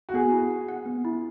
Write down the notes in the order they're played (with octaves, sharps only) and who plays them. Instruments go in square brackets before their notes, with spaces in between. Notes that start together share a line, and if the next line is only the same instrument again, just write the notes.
[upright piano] F#4
[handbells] B3 [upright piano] G#4
[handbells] E4
F#5
F#5
B3
E4